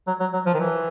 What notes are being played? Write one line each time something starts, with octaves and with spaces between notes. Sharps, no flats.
F#3
F#3
F#3
F3
D#3
E3